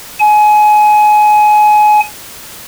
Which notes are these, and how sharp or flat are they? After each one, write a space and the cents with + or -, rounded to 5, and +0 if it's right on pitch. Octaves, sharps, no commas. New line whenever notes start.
G#5 +25